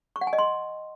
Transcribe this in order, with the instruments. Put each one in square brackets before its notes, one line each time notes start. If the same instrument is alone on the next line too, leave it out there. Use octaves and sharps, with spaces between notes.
[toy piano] C#6
F#5
G#5
D#5
C6